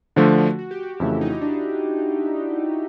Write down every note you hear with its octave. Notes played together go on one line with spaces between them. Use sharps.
D3 F3 A3 D4 F#4
F#4
G4
F#4
F2 C#3 E3 A3 E4
D#4
D4